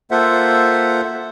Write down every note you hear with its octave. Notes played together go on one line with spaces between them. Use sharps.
A#3 F4 A4 C5 E5 F#5